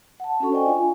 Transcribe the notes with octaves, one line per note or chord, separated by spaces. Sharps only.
F#5 A5
C#4 D4 F#4 A4 C#6
C5 D5 D#5 G5 G#5
D4 F4 F5 G#5